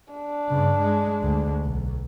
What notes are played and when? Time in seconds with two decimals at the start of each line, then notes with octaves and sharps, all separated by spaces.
0.13 D4
0.49 G2 C#3
0.78 G#3
1.22 D2 G#3
1.64 B1